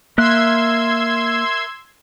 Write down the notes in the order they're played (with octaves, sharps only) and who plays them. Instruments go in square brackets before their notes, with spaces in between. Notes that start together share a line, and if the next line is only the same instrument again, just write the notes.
[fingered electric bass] A#3 [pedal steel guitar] A#4 E5 F#6 [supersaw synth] C6 E6 G#6